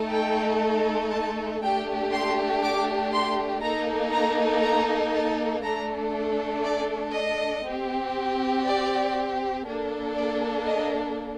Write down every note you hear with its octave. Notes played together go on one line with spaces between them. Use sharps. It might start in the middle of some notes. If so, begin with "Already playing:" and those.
Already playing: A3 D#4 A4
G5
A5
A3 D4 G4 G5
C6
D6
C6
A#3 D#4 A4 A#5
A#5
A#5
A5
A3 D4 A4 A#5
D5
D#5
C4 G4
D5
A#3 D4 A4
D5
D#5